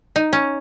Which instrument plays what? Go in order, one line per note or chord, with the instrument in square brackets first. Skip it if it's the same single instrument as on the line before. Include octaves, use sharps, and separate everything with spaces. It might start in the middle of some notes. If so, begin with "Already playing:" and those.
[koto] D#4
C#4